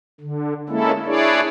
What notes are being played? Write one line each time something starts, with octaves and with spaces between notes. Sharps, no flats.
D3
G#3 A#3 C#4 E4 A4
D4 E4 G#4 C#5 D5